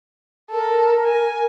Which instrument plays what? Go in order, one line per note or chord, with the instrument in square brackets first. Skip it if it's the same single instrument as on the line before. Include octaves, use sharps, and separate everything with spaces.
[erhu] A4 [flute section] A#4
[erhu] G#5